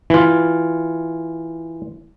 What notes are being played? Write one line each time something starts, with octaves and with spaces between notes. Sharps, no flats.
E3 F4